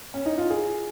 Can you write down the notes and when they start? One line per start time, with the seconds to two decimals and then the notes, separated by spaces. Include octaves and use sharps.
0.14 C#4
0.26 D#4
0.38 F4
0.50 G#4